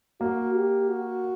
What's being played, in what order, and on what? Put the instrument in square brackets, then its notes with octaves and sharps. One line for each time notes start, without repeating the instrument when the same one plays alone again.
[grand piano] A#3 [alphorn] F#4
[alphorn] G4
F#4